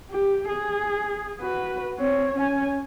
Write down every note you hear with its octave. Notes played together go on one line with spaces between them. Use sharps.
G4
G#4
F#4 B4
C4 C#5
C#4 G#5